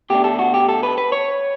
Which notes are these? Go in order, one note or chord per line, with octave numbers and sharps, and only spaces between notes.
B2 A3 D4 G4
A4
F#4
G4
A4
B4
B4
C#5